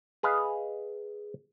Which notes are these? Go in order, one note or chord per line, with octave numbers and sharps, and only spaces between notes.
G#4 B4 D#5 F5